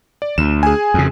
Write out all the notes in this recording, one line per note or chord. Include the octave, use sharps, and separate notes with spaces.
D5
D2 E7
G#4 G#5
F2 C#3